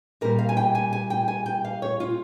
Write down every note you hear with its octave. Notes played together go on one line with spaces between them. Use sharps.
A#2 G3 A#4
F5
G#5
G5
G#5
G#5
G5
G#5
G5
F5
C#5
F4